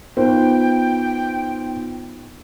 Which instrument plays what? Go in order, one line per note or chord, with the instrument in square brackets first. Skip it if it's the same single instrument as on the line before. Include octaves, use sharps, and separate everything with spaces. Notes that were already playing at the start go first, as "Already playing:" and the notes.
[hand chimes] B3 D#4 F4 [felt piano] C5 [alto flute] G5